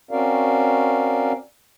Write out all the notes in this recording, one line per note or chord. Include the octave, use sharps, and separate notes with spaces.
C4 C#4 F#4 A#4 D5 F5